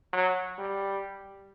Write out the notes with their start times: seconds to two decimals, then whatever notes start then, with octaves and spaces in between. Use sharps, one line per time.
0.13 F#3
0.59 G3